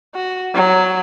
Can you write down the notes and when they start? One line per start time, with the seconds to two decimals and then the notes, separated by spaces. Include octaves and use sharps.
0.15 F#4
0.54 F#3